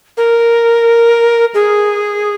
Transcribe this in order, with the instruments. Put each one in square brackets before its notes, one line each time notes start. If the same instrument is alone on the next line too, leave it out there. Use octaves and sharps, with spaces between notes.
[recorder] A#4
G#4